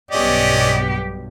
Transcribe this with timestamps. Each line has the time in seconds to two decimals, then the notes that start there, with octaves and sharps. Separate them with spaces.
0.11 B1 G2 B3 C#4 G4 D5 D#5